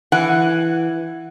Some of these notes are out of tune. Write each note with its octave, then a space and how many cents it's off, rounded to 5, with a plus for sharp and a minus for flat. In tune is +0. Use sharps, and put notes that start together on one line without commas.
E3 +10 F#5 +0